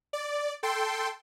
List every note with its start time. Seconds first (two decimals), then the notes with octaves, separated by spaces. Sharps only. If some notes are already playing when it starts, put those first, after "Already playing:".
0.13 D5
0.63 A4 G5 C6